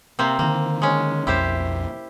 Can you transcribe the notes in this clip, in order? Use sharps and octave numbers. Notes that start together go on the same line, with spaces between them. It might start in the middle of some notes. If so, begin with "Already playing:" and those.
C3 A#3 C4
D3 D#3 A#3
G#3 C#4
B1 F2 E4 G4 C5